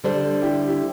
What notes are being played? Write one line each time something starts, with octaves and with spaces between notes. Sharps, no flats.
D3 G3 D4 A4 C5
E4 G4
E4 G4